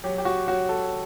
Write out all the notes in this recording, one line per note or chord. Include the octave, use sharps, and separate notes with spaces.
F#3 G4
G4
F#4
F#3 F#4
A4